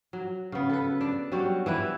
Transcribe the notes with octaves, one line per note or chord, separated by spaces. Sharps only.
F#3
C#3 B3
A4 B4
D4
F#3 G3 F#4 G4
E3 E4 B4